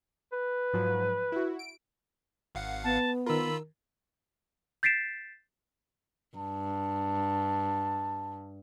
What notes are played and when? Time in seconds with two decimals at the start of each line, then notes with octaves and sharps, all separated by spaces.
0.33 B4
0.73 G#2 F3 F#3
1.32 E4 F#4
1.59 D7
2.55 G#1 F5 F#5
2.84 B3 A5
3.26 D#3 F4 A#4 B5 E6
4.83 G6 A6 B6 C7 D7 E7
6.37 G2 A5